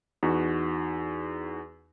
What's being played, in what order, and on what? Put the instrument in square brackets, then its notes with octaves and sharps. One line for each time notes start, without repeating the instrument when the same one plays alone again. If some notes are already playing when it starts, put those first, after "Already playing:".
[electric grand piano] E2 D#4 F#4